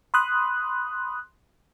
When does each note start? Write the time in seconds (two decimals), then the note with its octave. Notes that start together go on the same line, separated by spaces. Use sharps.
0.14 B5 C6 D#6 F#6